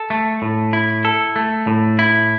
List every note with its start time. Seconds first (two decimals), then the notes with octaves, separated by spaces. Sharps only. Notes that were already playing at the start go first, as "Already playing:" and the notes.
Already playing: A4
0.10 A3
0.42 A2
0.73 E4
1.05 A4
1.36 A3
1.67 A2
1.99 E4